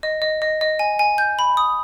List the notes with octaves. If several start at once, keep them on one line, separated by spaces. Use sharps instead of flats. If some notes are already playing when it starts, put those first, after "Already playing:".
D#5
D#5
D#5
D#5
G#5
G#5
G6
B5
D#6